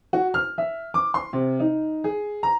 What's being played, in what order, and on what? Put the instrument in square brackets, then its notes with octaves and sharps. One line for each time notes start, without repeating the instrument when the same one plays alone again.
[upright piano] F#4
F6
E5
D6
C6
C3
D#4
G#4
A#5